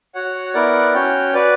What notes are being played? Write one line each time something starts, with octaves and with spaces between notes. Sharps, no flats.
F#4 C#5 F#5
B3 E4 A#4 D5 F#5
C#4 F#4 C#5 G5
F#4 B4 D5